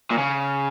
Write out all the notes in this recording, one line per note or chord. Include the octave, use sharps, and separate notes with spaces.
A#2
C#3